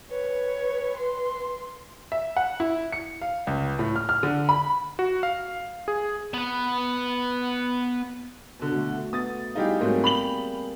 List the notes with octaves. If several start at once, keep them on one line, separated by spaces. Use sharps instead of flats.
B4 C#5
C6
E5
F#5
E4
C#7
F5
C#2
A2
F6
F6
D3
B5
F#4
F5
G#4
B3 B4
B2 D3
A3 F#4
B3 D#6 A6
G3 D#4 E4 G4 G#4 F5
G#2 F#3 A3 A#3 C4
B5 F7 F#7